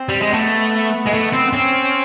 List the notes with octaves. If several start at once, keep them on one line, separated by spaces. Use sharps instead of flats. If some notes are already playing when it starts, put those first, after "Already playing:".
Already playing: C4
G3
G#3
A3 B3
G#3
A3
C4
C4 C#4